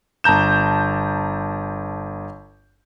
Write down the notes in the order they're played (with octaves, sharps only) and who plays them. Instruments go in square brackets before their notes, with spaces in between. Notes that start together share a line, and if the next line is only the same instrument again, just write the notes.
[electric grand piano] G1 A5 A#5 G6 E7